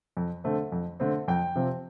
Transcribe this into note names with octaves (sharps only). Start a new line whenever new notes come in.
F2
D3 A3 C4
F2
D3 A3 C4
F2 G5
C3 F3 C4